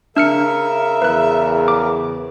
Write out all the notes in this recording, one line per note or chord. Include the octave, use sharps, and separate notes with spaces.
C#3 D4 A#4 E5 F6 C#7
E2 B4 F#6
D6